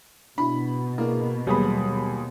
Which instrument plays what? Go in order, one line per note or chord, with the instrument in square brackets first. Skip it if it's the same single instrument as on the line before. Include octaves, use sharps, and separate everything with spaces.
[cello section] B2 [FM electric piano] D4 E4 F#4 [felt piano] B5
[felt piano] A#3 [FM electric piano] D4 E4 G#4
[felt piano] D#2 G#4 B5 [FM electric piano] F#3 G3 B3